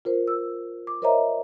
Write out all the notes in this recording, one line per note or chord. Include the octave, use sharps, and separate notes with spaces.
F4 A#4 C5
E6
D6
A#4 C5 C#5 D#5 E5 A#5